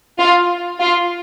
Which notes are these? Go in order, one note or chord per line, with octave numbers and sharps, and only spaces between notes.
F4
F4